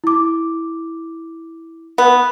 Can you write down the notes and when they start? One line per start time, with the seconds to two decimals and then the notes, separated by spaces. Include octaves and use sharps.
0.04 E4 D6
1.98 B3